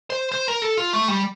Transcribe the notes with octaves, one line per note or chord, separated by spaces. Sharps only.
C5
C5
A#4
A4
F4
A3
G3